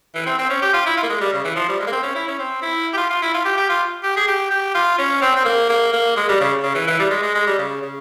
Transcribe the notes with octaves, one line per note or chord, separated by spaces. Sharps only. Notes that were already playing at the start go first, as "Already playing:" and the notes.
E3
C4
C4
C#4
G4
F4
E4
F4
A#3
G#3
G3
C#3
E3
F3
G3
G#3
A#3
C4
C#4
E4
C#4
C4
E4
G4
F4
F4
E4
F4
G4
G4
F4
G4
G#4
G4
G4
F4
C#4
C4
C4
A#3
A#3
A#3
G#3
G3
C#3
C#3
E3
E3
G3
G#3
G#3
G#3
G3
C#3
C#3